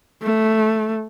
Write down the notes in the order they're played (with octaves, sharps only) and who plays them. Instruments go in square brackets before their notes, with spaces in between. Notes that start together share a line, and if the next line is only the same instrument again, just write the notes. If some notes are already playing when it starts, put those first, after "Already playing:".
[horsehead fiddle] A3